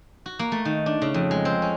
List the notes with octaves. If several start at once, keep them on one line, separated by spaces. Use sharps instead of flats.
F#4
A#3
A3
D#3
D4
C#3
F2
G#3
C4
C#4